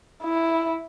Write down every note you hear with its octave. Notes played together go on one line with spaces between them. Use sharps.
E4